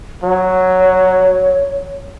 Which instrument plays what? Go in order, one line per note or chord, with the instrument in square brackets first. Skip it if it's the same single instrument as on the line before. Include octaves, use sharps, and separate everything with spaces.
[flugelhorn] F#3 [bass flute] C#5